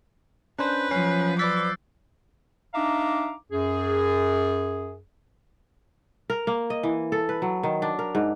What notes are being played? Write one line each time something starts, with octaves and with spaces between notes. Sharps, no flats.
C#4 D4 B4 C5 F#6 G6
F3 F#3 C#4 C7
B4 D5 D6 E6 F#6 A6 B6
D4 D#4 E5 F5 A#5 D6
F#2 G#4
A#4
A#3
D#5
E3
A4
B4
F#3
D#3
D4
A#4
G#2